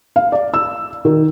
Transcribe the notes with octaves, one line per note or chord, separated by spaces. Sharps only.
F5
D5
E6
D#3